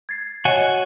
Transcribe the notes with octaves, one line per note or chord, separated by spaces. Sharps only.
G#6 A6 C7
F#4 C#5 D#5 F#5 G#5